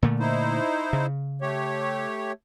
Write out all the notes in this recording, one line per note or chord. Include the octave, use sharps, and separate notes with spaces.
A#2 D3 A3
D#4 E4 C5
C#3
A3 G4 C#5